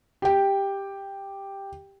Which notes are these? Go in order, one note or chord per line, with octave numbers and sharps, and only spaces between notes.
G4 G5